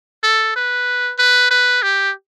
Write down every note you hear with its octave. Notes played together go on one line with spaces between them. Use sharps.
A4
B4
B4
B4
G4